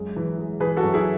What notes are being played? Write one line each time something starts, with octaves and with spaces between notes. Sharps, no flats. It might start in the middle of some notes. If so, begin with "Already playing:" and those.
Already playing: F#2 G#3
E3
G#3
E3 G#4 B4
F#4 A4
F#2
E4 G#4